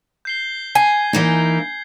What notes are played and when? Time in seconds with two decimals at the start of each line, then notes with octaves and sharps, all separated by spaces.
0.25 G6 C7 G7
0.75 G#5 G#6 C7
1.13 E3 A#3 D#4